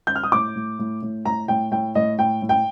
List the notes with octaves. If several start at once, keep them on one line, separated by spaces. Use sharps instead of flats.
G6
F6
D#6
A2 D6
A2
A2
A2
A2 A#5
A2 G5
A2 G5
A2 D#5
A2 G5
A2
G5